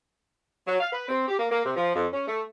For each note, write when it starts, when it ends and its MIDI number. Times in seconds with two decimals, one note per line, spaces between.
0.67 0.78 54
0.80 0.88 77
0.92 1.05 71
1.09 1.25 60
1.27 1.37 67
1.39 1.47 58
1.51 1.65 58
1.65 1.75 48
1.77 1.93 53
1.94 2.06 41
2.13 2.25 61
2.27 2.42 57